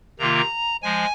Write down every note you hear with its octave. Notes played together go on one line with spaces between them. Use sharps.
C3 D#3 A#3 F4 A#5
F3 G#3 G#5